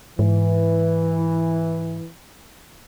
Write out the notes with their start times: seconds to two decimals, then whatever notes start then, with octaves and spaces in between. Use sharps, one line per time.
0.19 G#2 E3